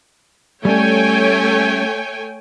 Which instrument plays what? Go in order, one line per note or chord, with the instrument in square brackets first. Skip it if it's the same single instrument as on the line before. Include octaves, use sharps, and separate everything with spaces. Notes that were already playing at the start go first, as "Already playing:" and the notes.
[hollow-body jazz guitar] G3 C#4 [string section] A3 [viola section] C#5 G5 G#5